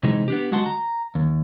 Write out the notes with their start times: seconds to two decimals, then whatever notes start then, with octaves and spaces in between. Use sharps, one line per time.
0.03 C3 E3 G#3 D#4
0.28 B3 D4 G4
0.51 D2 G#3 F#4 F#5 A5 C6
0.66 A#5
1.15 D#2